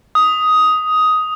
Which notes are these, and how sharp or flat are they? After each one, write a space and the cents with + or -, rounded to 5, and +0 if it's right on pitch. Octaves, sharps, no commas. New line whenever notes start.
D#6 +10